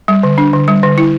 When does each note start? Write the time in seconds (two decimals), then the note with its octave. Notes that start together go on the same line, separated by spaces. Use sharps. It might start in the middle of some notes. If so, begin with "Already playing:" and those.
0.08 G3
0.23 D3
0.38 D4
0.53 D3
0.68 G3
0.83 D3
0.98 E4